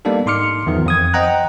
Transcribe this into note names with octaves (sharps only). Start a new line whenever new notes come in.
G3 A#3 B3 D4 D#4 A4
G#2 D#4 C6 D6 F6 C#7
E2 G2 D#3 F3
F2 D#6 G#6
C5 D#5 F#5 G5 A#5 F#6